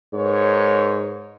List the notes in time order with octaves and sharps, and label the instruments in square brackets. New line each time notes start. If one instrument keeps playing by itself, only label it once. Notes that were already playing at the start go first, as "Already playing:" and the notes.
[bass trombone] G#2 [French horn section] A#4 B4 C#5